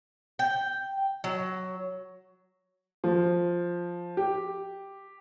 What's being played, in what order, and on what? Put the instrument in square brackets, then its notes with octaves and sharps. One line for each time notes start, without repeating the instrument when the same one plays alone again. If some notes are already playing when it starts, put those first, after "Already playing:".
[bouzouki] G5
F#3
[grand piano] F3
G4